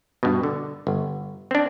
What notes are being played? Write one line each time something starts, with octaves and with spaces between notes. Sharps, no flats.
G2 B2
D3
G1
C4 D4